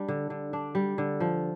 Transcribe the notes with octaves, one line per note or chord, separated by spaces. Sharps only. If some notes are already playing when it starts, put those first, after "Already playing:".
Already playing: G3 D4
D3
D3
D4
G3
D3
F3